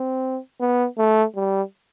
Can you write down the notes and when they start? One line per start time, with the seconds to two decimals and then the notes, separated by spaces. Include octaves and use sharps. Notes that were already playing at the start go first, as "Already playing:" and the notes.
Already playing: C4
0.60 B3
0.98 A3
1.36 G3